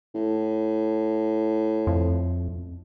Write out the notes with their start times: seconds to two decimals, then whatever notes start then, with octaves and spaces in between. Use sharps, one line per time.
0.15 A2
1.87 F2